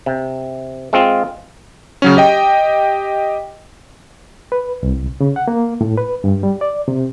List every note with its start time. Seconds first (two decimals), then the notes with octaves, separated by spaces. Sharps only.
0.06 C3
0.93 G#3 C4 F4
2.02 C#3 F#3 C#4
2.17 G4 D#5 G5
4.52 B4
4.83 C2
5.21 C#3
5.36 F#5
5.48 A#3
5.81 A2
5.98 B4
6.24 G2
6.43 G3
6.61 D5
6.88 C3